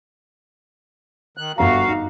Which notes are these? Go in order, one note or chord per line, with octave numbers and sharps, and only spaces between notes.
D#3 F#6
G1 G2 F#4 F5 A#5
D#4